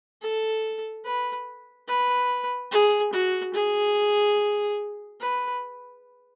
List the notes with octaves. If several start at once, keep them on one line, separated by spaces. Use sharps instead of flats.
A4
B4
B4
G#4
F#4
G#4
B4